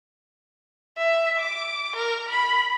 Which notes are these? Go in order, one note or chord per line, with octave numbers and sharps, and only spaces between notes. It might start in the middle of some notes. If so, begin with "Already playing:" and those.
E5
D6
A#4
B5